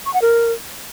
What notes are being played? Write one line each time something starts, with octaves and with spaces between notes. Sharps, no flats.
C#6
F#5
A#4